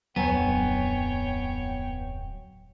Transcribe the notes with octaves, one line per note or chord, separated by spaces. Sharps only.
D1 F2 F#3 B3 C#5 G5 G#5